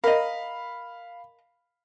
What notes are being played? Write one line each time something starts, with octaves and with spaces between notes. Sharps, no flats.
A#4 D#5 F5 B5